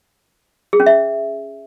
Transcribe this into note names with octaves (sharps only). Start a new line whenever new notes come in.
G#4
C#4
E5